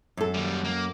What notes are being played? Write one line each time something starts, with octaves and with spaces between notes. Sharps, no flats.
F#2 A4
D#2 G3
A#3